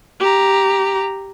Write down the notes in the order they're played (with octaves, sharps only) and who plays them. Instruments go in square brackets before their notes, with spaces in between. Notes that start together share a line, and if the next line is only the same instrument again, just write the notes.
[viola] G4 A#5